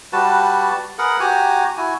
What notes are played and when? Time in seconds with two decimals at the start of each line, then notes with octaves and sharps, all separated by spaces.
0.13 G3 F#4 B4 A5
0.98 G#4 A#4 B4 F#5
1.20 F#4 G4 G#5 A#5
1.77 E4 F#4 G#5